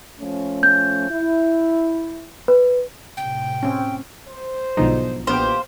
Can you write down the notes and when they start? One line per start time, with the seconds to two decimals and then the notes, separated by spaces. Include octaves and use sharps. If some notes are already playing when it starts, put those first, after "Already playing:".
0.20 F3 A3 C#4
0.63 G6
1.09 E4
2.48 B4
3.17 A2 C3 G5
3.63 C4 C#4
4.27 C5
4.77 B1 G#2 B2 D3 F3 D#4
5.27 A#1 D#3 E3 B3 G4 C5 F5 G5